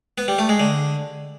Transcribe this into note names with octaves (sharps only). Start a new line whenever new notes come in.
B3
G3
A3
G#3
D3